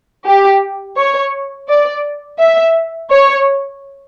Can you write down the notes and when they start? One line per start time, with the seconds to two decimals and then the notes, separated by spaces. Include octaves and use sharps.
0.26 G4
0.97 C#5
1.68 D5
2.39 E5
3.11 C#5